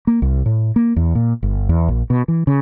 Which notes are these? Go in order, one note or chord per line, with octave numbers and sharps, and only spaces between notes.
A#3
C2
A2
A#3
E2
A#2
G1
E2
A#1
B2
E3
C#3